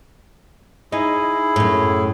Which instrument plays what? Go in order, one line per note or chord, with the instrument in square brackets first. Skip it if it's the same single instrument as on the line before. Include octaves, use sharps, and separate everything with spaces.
[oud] D#4 [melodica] E4 G#4
[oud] F#2 A2